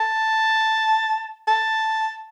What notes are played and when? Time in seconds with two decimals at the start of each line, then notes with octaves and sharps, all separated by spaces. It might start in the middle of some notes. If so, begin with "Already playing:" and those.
Already playing: A5
1.48 A5